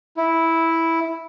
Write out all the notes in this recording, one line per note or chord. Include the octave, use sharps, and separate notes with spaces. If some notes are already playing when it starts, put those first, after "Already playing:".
E4